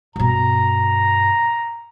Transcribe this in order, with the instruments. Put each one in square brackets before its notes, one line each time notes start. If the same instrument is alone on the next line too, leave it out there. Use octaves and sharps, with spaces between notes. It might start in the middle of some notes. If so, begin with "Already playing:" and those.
[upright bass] G2 B2 [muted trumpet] A#5